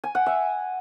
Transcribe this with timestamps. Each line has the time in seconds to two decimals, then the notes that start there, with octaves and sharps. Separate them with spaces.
0.04 G#5
0.15 F#5
0.26 E5